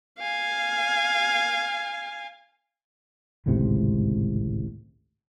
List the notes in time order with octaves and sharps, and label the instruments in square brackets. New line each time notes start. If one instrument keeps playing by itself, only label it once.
[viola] F5 G#5
[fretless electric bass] G#1 C#2 A2 C3